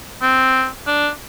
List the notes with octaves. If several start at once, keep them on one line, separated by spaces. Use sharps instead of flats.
C4
D4